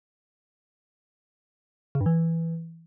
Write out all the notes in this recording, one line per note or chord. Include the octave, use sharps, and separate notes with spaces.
C#3
G2
E3